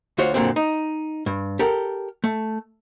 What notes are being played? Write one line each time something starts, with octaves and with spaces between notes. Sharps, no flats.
D2 F4 F#4 C5 C#5
F#2 A#2 D3 C4
D#4
G2
G4 A4 A#4 F#5
A3